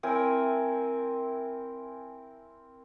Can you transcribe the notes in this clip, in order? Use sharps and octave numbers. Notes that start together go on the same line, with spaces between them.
C4 E4 A#4 G#5